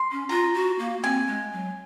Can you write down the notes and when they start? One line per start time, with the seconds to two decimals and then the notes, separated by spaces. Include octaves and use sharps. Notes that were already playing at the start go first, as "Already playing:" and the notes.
Already playing: C6
0.11 C#4
0.29 F4 A#5
0.55 F#4
0.79 A#3
1.03 C4 G#5
1.27 G#3
1.52 F#3